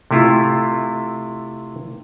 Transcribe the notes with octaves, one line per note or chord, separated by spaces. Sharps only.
C3 A3 E4 F4